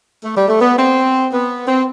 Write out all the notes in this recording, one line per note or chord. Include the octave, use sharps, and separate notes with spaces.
A3
G3
A3
B3
C4
B3
C4